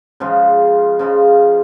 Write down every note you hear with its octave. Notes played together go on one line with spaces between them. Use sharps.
C#3 F3 G#3 F4
C#3 F3 G#3 F4